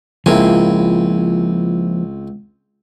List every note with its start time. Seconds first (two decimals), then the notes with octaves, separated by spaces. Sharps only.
0.26 C#2 F3 A#3 C4 E4 G#5